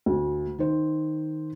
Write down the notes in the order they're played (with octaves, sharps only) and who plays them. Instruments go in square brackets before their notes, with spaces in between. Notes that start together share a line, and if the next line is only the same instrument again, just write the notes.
[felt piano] D2
D#3 C5